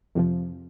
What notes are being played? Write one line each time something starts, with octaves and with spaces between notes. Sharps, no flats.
F2 C3 F3